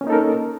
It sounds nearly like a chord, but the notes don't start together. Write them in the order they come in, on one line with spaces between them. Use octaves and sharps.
C#4 A#3 D#4 A4 A#4